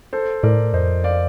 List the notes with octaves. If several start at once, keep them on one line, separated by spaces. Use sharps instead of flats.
A4 C5
A2 A#4 D5
F2 C5 D#5
D5 F5